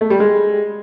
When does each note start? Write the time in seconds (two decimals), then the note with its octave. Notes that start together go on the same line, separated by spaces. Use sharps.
0.01 A3
0.10 G3
0.20 G#3